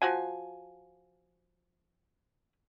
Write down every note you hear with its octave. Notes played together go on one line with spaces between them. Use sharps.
F3 F#4 G#5